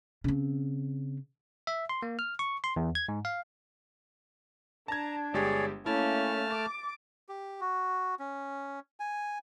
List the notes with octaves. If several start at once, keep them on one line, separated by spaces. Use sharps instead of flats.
C#3 C4
E5
C6
A#3
F6
C#6
C6
E2
G#6
G#2
F5
D4 A5 A#5 G#6
G1 G#3 G4 G#4 C#5 D5
A3 A#3 C#4 E4 A5 F6
D6 A6
G4
F#4
C#4
G#5